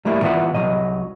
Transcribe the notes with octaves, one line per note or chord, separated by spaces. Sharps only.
G3 A3 A#3 E4
A#2 E3 B3 F4 E5 F#5
C2 F#3 D#5